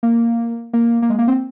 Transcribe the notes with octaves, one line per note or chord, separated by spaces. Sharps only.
A#3
A#3
A#3
G#3
A#3
C4